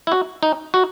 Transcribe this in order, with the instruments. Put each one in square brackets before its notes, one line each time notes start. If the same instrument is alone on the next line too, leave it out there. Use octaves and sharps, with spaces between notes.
[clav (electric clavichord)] E4
F#4
D#4
F#4